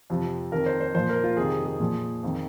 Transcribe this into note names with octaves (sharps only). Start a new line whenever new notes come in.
F2 C3 F3
F2 D#3 A#4
C5
C5
A#2 F3 C5
A#4
F4
F2 C3 D#3 G#4
G#4
A#2 F3
F2 D#3